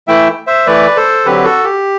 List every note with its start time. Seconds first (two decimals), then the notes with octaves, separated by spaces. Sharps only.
0.08 E3 A3 E4 E5 G5
0.47 C5 E5
0.66 E3 A3 E4 B4 D5
0.96 A4 C5
1.25 D3 F#3 C4 G4 B4
1.44 F#4 A4
1.64 G4